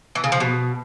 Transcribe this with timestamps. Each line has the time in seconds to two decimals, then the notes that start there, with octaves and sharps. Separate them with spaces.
0.15 E3
0.24 C#3
0.32 F3
0.40 B2